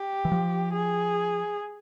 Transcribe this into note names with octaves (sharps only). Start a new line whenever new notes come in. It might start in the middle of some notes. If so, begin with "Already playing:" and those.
Already playing: G4
E3
F3
G#4